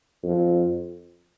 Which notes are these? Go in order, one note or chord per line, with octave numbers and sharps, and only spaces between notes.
F2